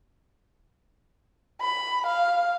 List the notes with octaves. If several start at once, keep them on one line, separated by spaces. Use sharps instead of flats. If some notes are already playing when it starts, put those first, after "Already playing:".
B5
F5